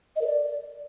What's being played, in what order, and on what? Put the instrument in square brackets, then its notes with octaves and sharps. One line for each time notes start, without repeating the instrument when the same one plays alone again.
[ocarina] D#5
A#4
D5